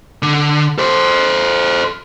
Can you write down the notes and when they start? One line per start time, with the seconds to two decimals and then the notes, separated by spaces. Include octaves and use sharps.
0.23 D3
0.78 A4 C5